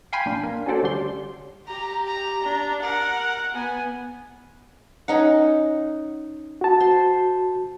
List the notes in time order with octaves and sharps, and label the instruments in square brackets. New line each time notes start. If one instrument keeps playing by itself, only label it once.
[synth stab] F5 G5 G#5 B5 C6
A#1 D4
A#3
C#4 D4 F#4 A4 C5 D5
D2 G3 C#4 G4 C6
[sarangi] G4 [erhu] A#5
[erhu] A#5
[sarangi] D4
[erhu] A#4 [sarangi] F#5
[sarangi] B3 [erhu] G#5
[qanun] C#4 D#4 F#5
[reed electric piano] F#4 A5
[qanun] C5